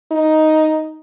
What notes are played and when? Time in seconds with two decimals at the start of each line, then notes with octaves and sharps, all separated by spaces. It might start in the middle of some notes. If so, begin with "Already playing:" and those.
0.12 D#4